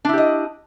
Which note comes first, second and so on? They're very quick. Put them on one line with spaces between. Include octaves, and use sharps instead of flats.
D4 E4 G4 D#5